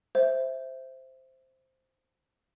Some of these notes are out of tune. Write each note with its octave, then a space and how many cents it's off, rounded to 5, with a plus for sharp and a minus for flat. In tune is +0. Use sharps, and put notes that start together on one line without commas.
C5 +0 E5 +0